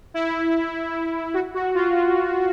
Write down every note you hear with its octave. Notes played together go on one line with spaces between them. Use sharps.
E4
F#4
F#4
F4
F4